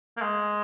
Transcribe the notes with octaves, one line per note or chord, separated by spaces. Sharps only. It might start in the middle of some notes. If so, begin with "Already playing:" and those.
A#3
G#3